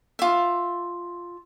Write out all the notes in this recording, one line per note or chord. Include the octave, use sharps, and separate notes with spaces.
F4 E5